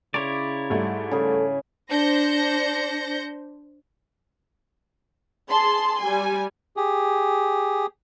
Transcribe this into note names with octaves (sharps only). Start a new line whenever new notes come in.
C#3 E4 C#5 D5 A#5 C6 D6
G#2 G3 A3
C#3 G#4 A4
D4 C5 G6 A#6 C#7
G#4 A5 C6
G3 G#5
G4 G#4